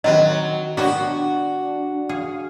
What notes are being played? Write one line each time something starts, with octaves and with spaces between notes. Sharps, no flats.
D#3 F#3 C4 B4 D#5
B3 D4 F#4 G4 C#5
G#4 F5